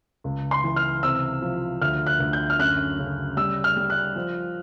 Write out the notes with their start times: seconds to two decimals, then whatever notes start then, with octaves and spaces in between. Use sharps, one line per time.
0.24 C#2
0.51 C6
0.64 E3
0.76 F6
1.03 C3 E6
1.42 F3
1.81 D2 F6
2.07 F#6
2.20 D2
2.33 G6
2.50 F6
2.59 F#2 F#6
2.99 C#3
3.37 G3 E6
3.64 F6
3.77 G3
3.90 F#6
4.16 F3